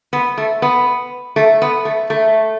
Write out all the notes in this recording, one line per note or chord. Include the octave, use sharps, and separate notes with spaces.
B3
A3
B3
A3
B3
A3
A3